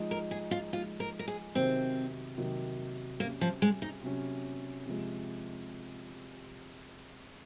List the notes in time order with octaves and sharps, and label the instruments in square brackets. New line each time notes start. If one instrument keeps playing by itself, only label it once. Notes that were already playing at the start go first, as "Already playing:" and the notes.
Already playing: [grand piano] F3 G#3 D#4
[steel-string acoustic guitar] A#4
G#4
F4
[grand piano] F3 G#3 D#4 [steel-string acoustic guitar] F4
[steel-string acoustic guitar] A#4
A#4
G#4
[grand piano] C3 D#3 F#3 [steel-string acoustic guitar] C4
[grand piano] C3 D#3 F#3
[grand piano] C3 F#3 C#4 [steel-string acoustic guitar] A#3
[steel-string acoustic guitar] F3
G#3
D#4
[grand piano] C3 F#3 C#4
C3 F3 G#3